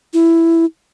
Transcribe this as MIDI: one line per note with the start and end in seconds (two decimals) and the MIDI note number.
0.13 0.65 64